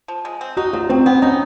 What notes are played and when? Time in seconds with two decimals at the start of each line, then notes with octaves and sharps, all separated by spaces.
0.08 F3
0.25 G#3
0.41 C4
0.57 D#4 F#4
0.73 F#3 F4
0.89 F#3 C4
1.06 B3 C4
1.22 C#4 D#4